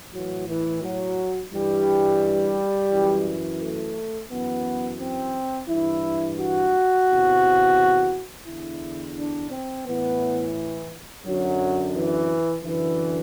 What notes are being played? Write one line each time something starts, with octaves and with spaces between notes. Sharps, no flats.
A2 E3 F#3
E3
F#3
G2 E3 G3
F#2 E3
A3
F#2 E3 B3
C4
G2 E3 E4
F#4
E2 C3 E3
E2 D3 E4
D4
C4
A2 E3 B3
F#2 D3 F#3
E3
F#2 D3 E3